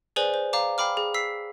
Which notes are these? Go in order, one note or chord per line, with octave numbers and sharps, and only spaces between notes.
G#4 B4 C5 D5 G#5 F#7
C5
D5 F5 A#5 D6
F5 G5 B5 D6 F6
G#4
E6 B6 C7